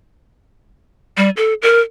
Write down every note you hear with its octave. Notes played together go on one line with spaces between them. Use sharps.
G3
A4
A#4